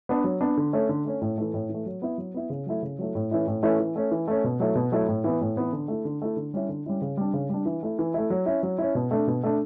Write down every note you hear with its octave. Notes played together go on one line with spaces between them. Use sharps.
B3 D4
F#3
B3 D4
D3
A3 C#4
D3
A3 C#4
A2
E3 A3
A2
E3
A3
F#3
B3 E4
F#3
B3 E4
C#3
F#3 A3 E4
C#3
F#3 A3 E4
A2
E3 A3 C#4 E4
A2
E3 A3 C#4 E4
E3
A3 C#4
E3
A3 C#4
B2
F#3 A3 E4
B2
F#3 A3 E4
A2
E3 B3
A2
E3 B3
D3
A3 E4
D3
A3 E4
D3
G3 C#4 E4
D3
G3 C#4 E4
C#3
G3 D4
C#3
G3 D4
E3
A3 E4
E3
A3 E4
F#3
C#4 E4
F#3
C#4 E4
B2
A3 D4
B2
A3 D4